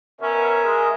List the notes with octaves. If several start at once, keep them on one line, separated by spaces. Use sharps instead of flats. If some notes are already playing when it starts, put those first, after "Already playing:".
B2 C#4 A#4 E5
G#3